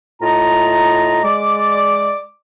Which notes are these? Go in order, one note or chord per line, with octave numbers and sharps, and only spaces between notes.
A2 F4 D#5 A#5
G#3 D5 D6